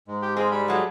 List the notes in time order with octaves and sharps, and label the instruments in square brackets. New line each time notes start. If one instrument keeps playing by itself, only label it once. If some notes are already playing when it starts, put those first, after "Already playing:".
[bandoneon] G#2 G#3
[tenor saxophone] G4
[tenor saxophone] C4 [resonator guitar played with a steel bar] G#4 [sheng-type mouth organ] D#5 F5
[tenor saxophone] G3 [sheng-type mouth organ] B5
[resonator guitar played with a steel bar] F#3 A3 [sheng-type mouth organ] F#4 G#4